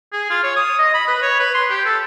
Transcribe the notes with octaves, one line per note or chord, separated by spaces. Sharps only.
G#4
F4
C#5
D#6
D#5
B5
B4
C#5
B4
C6
G4
A4